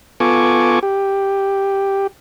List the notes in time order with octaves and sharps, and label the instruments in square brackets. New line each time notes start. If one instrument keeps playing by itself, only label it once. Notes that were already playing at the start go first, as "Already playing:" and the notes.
[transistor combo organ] B3 F4 A4 G#5 C#6 D6
G4